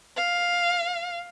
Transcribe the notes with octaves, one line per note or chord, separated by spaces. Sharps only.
F5